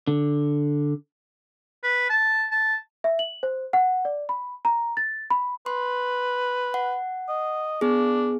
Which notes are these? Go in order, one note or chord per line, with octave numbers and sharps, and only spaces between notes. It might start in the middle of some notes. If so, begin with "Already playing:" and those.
D3
B4
A5
A5
E5
F#7
C5
F#5
D5
B5
A#5
A6
B5
B4 C6
F#5
D#5
B3 D4 G#4